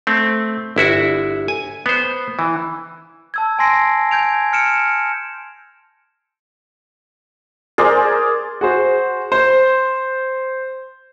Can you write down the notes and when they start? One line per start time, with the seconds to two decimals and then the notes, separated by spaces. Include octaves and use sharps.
0.07 A3 C4
0.76 G1 E4 F#4 E5
1.48 G#5
1.86 B3 C5
2.39 E3
3.34 A5 E6 G#6
3.59 G#5 A5 C6 A#6 C7 D7
4.11 G#5 G6 G#6 D7 F7
4.53 F6 C#7 D7 E7
7.78 G#4 A#4 C5 D5
8.61 F#4 G#4 C5
9.32 C5